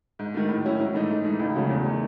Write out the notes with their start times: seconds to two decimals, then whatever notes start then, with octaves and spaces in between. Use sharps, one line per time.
0.19 G#2
0.34 D#3 A3
0.49 A2
0.65 F#3 C#4 E4
0.79 G#2
0.94 E3 A3 D#4
1.10 G#2
1.24 E3 A3 D#4
1.39 C#2
1.56 C#3 F#3 A3 C#4
1.70 E2
1.86 D#3 A3